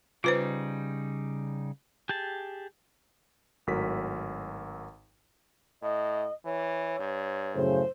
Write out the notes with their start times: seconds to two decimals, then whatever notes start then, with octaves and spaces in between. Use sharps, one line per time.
0.24 C#3 G3 D#4 F4 B4 C5
2.09 G4 G#4 A5
3.67 G#1 A2 F#3 A#4 B6
5.82 A2 D#5
6.45 E3 C#5
6.99 G2
7.55 F#2 A2 C#3 C5